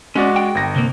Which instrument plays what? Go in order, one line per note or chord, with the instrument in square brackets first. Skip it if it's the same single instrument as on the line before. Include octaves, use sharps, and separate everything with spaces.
[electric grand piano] G#3 F#4 D5 [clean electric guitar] C#4
[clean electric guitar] G5
[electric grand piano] G1 A#6
[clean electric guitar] C3 A#3